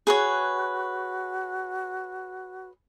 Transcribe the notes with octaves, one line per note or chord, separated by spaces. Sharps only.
F#4 G#4 B4 C#5